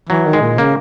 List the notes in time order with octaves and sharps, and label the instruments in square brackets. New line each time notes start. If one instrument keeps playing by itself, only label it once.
[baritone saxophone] E3 [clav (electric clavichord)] F#3
[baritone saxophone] D#3
[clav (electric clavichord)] G#3
[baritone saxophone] A#2
[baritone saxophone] C#3 [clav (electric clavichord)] A#3